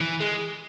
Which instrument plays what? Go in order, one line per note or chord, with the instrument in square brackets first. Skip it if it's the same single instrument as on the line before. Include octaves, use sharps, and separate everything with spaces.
[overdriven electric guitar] E3
G#3